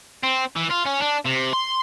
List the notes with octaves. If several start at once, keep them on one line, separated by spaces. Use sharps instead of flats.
C4
E3
F4
C#4
D4
C3
C6